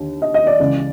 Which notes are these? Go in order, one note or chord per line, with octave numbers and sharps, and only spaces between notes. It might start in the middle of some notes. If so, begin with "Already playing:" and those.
Already playing: D#2 D3
D#5
D#5
D5
C#2 C#3 E3